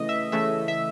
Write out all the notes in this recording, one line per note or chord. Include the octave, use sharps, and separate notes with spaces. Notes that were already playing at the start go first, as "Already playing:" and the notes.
Already playing: C#3 E3 A3 D#5
E5
C#3 E3 A3 E5
E5